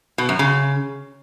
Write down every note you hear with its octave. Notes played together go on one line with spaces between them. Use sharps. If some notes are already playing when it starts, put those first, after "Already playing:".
B2
F#2
C#3